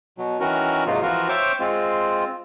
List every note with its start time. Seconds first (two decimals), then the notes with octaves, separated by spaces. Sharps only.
0.18 B2 F#3
0.40 D#3 E3 C#4 F#4 A#4
0.87 G#2 C3 F#3 A#3 D#4 F4
1.02 E3 F3 F4 F#4 A#4
1.29 C5 C#5 E5 G5 C#6 D6
1.60 G#3 C4 F4